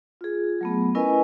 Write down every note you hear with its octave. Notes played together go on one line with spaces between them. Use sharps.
F4 G#4
F#3 A3 B3
C#4 E4 A#4 B4 D#5 G#5